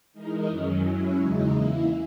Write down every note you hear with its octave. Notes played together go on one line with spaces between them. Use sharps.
E3 G#3 D#4 A#4
F#2 D#3 F#3 C#4
F#3 C#4 E4
E2 C#3 G#3 D#4
E3 A#3 E4